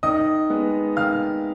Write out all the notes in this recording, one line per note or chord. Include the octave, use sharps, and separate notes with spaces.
D#3 D#5 D#6
G#3 B3
D#3 F5 F6